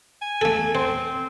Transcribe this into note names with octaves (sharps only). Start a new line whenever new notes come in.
G#5
A3 A4
C4 C5